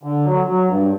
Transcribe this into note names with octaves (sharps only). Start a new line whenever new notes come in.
D3
F#3
F#3
G2